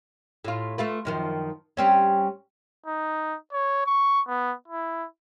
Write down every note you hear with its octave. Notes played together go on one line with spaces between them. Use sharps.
A2 F4
A3 F4 B4
F#2 D#3 F3
G3 C4 C#4
D#4
C#5
C#6
B3
E4